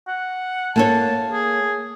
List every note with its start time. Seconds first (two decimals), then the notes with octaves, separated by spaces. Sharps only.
0.08 F#5
0.76 A#3 A4 C#5 A5
1.32 G#4